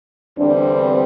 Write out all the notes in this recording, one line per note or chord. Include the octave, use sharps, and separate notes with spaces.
E2 D3 G3 C4 D4